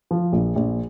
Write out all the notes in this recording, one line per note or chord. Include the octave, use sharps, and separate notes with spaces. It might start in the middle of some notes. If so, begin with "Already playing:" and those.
F3
A#1
A#1